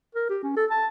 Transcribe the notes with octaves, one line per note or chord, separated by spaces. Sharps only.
A#4
G4
C#4
A4
A5